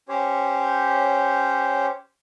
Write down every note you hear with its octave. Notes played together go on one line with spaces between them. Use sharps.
C#4 G4 C5 C#5